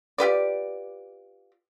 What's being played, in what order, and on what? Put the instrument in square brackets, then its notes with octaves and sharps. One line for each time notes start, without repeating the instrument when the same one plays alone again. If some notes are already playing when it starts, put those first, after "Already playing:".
[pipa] F4 G4 B4 D5